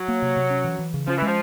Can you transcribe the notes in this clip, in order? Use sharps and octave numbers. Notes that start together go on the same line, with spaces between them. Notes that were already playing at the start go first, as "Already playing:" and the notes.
Already playing: F#3
A#3
C3
C3
C#4
E3
E3
C#3
F3 C#4
E3
F3 G#3